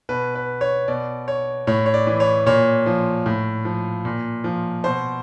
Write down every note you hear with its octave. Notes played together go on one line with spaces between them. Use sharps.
B2 B4
B4
C#5
B2 D5
C#5
A2 C#5
C#5
D5
E3
C#5
A#2 C#5
F3
A2
F3
A#2
F3
B2 C5